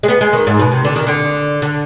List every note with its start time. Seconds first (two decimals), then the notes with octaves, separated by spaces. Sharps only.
0.03 G#3
0.08 B3
0.21 G#3
0.33 D#3
0.47 G#2
0.59 B2
0.72 C3
0.85 D3
0.96 D#3
1.07 D3
1.62 D3